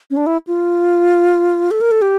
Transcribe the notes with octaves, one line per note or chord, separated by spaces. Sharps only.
C#4
D4
E4
F4
A4
A#4
A4
G4